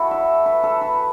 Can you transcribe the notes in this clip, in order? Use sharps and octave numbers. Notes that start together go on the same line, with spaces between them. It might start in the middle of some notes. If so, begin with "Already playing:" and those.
Already playing: E4 F#4 A4
E5
B4
A4
B4